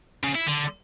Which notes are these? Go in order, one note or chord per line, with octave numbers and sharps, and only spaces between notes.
C#3
E4
D3